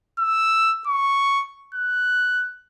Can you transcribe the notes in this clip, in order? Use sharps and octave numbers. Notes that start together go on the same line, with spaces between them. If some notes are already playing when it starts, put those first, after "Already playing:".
E6
C#6
F#6